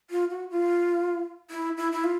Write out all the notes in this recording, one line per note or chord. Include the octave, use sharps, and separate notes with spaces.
F4
F#4
F4
E4
E4
E4
F4